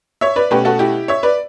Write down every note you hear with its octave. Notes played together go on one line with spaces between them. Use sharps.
C#5 E5
B4 D5
B2 A3 C#4 G4 B4
F#4 A4
E4 G4
C#5 E5
B4 D5